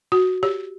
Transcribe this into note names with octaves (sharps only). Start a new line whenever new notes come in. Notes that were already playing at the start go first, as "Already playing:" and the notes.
F#4
G4